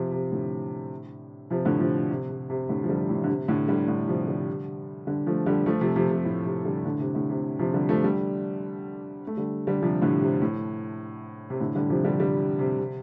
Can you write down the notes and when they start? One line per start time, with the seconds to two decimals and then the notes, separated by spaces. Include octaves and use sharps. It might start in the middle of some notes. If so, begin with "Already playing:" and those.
Already playing: C3 F3
0.12 C3
0.32 A2 D3
1.50 C3 F3
1.65 A2 D3
1.80 C3 F3
2.10 C3
2.30 C3
2.50 C3
2.69 A2 D3
2.83 F3
2.89 D3 G3
3.09 A2
3.24 D3
3.28 C3
3.48 A2 D3
3.68 D3 G3
3.88 A2 D3
4.08 C3 F3
4.27 D3 G3
5.07 D3 G3
5.27 F3 A3
5.46 D3 G3
5.66 F3 A3
5.81 C3 F3
5.96 C3 F3
6.11 C3
6.25 A2
6.46 C3
6.65 D3 G3
6.85 A2 D3
7.00 C3
7.14 A2 D3
7.30 C3
7.59 C3 F3
7.74 D3 G3
7.89 F3 A3
8.04 D3 G3
9.27 A3
9.37 D3 G3
9.67 D3 G3
9.82 C3 F3
10.02 A2 D3
10.22 C3
10.42 A2
11.50 C3
11.60 A2 D3
11.75 D3 G3
11.90 C3 F3
12.04 D3 G3
12.19 D3 G3
12.59 C3
12.79 C3